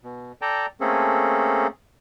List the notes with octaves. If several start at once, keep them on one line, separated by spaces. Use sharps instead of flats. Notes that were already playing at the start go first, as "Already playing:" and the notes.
B2
A4 D5 G5 A5 A#5
A3 A#3 C4 C#4 G#4 A4